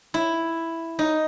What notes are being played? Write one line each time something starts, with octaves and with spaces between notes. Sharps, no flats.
E4
D#4